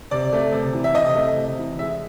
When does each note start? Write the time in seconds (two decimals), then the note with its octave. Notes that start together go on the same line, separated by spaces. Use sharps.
0.11 C3 D5
0.33 A3
0.52 C3
0.73 E3
0.84 E5
0.95 C3 D#5
1.15 A3
1.36 C3
1.58 E3
1.79 G#3 E5